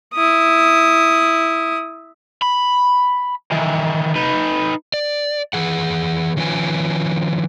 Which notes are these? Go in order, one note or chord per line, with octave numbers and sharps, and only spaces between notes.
E4 D#6
B5
D#3 E3
D#4 B4
D5
E3 G#4 F#5
D#3 F3 C#4 B4 G#5